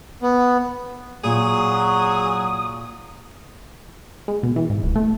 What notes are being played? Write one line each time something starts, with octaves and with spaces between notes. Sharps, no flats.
B3
A#2 F#3 G#4 D#6
G#3
B2
E3
G#2
D1
A3